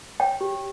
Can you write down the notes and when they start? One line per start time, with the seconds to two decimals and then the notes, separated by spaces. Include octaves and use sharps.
0.20 C#5 G5
0.41 G4